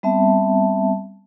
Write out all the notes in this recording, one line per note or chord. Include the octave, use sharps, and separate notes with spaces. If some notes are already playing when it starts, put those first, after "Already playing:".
G3 B3 C4 E5 A5